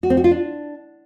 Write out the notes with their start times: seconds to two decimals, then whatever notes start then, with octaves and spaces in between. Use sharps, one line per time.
0.03 F#4
0.10 C4
0.17 F#4
0.24 F4
0.31 D4